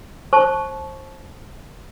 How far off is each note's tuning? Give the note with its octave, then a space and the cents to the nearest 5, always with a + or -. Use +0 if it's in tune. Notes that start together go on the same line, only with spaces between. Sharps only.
C5 +30 A5 -25 C#6 +0